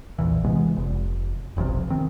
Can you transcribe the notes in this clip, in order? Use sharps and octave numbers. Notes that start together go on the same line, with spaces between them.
A#1 E2 A#2 E3
C3 E3 G#3 B3
F1
F1 B1 C3 F3
D#3 C4